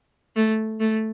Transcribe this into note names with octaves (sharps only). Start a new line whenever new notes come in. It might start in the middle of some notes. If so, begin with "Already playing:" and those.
A3
A3